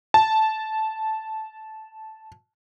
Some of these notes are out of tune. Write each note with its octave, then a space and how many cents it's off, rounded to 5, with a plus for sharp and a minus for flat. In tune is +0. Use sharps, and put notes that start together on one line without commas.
A5 -10